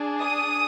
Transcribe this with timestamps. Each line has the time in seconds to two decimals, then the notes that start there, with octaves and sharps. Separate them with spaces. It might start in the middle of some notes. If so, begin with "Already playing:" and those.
Already playing: D4 G#4
0.19 D#6